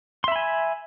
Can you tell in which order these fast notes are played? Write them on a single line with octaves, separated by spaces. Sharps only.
C6 E5 B5 G#5